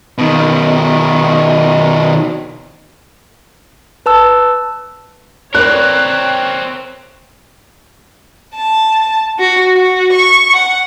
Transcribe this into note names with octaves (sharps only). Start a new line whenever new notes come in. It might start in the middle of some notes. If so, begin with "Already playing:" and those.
B2 D#3
B4 A5 E6
C4 A#4 B4 C#5 D5 F#6
A5
F#4
F#4
C#6
F#5